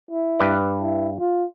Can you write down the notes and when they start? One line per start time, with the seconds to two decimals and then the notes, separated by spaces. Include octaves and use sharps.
0.11 E4
0.39 G2 B4 D5
0.82 E4
1.20 F4